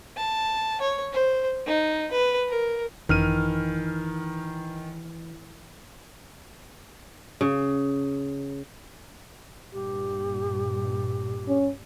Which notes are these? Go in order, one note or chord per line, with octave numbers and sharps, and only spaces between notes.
A5
C#5
C5
D#4
B4
A#4
G#1 F#2 D#3 E3 F6 D#7
C#3
G2 A#2 G4
C#4